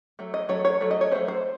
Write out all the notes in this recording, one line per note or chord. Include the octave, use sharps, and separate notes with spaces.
F#3 A3
D#5
F#3 A3 C#5
C#5
F#3 A3
D#5
C#5
F#3 A3 C#4 C5
C5